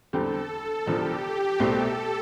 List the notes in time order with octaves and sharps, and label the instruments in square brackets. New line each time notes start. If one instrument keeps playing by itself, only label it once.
[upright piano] E2 D3 G3 C4 G4 [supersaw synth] A4
[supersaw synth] A4
[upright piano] E1 E2 D3 F3 [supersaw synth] G4
[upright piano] C2 B2 A3 C4 G4 [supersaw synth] A4